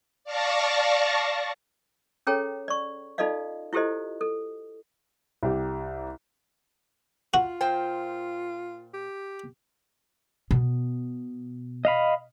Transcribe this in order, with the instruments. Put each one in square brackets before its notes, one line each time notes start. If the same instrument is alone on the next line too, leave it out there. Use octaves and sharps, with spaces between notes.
[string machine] D5 F5 A5 C#6 A#6
[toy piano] C#4 G#4 A4 C#5 G5 A#5
D5 C#6
D#4 F4 A4 D5 D#5 F5
E4 F4 G4 A4 C5 D#5
A4
[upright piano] C2 G4
[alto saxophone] F4 [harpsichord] F#4
[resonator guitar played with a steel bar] A#2 C5 G5
[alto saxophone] G4
[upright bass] B2
[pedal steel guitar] D#5 F5 B5